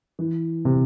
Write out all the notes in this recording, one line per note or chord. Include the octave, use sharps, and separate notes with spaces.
E3
C3